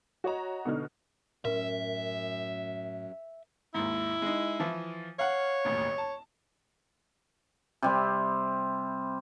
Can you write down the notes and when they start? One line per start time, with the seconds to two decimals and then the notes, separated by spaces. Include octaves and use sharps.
0.24 F#4 C#5 D#5 A#5
0.65 B2 D3 D#4 F6
1.45 F#2 A2 C#4 A#4 E5
3.74 D#2 G#2 E4
4.22 G#3 D#4
4.60 E3 F3
5.19 C#5 F5 F#5
5.65 E1 A1 D#2
5.98 A5
7.82 C3 G3 C4